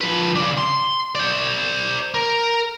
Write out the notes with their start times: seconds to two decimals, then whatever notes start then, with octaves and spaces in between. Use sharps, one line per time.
0.01 F3 B4
0.36 C#3 D4
0.58 C6
1.15 C5 D5
2.14 A#4